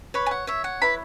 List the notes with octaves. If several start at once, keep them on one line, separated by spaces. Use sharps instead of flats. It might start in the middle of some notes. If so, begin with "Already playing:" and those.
B4 C#5 B5
G#5
F#5
C#5 E5
F#5
E4 B4 B5